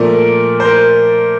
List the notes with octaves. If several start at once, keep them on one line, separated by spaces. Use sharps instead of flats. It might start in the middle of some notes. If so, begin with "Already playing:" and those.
Already playing: A#2 F3 A3 A#4 D5
C5
A#4